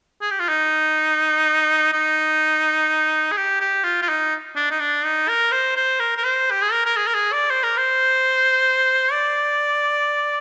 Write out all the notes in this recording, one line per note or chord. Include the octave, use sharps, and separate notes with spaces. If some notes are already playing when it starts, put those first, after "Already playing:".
G#4
G4
F4
D#4
D#4
G#4
G4
G4
F4
F4
D#4
D4
D#4
D4
D#4
A#4
C5
C5
A#4
A#4
C5
G4
G#4
A#4
A#4
G#4
A#4
G#4
D5
C5
A#4
C5
D5